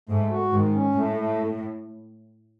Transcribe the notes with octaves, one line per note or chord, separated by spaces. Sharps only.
G#2 A3
F#4
G#2 D#3
C#4
A2 A3
A3